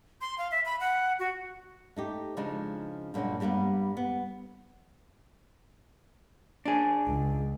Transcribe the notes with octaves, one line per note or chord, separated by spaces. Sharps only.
C6
F5
E5
B5
F#5
F#4
A3 D#4 G4
C#3 F3 G#3 D4 D#4
G2 A#2 F#3 G#3 C#4
G2 G3 G#3 A#3 B3
B3
D4 G#4
C#2